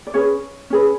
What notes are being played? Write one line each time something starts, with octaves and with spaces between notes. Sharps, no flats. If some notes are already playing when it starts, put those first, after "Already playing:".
D5
C#4 G#4 B4 C#5
C#4 G#4 B4